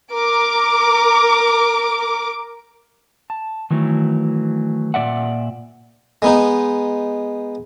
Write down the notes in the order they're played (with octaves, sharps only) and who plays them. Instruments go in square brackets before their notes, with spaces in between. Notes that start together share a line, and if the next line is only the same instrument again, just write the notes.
[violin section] A#4 D6
[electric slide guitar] A5
D#3 E3 F#3 A3
A#2 D#3 D5 E5 F#5
[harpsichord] G#3 B3 D#4